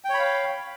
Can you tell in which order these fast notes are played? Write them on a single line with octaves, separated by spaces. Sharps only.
G5 C#5 B5 F5